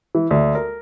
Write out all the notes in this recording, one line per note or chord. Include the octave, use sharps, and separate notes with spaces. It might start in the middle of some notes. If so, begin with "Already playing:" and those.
E3
D2
A#4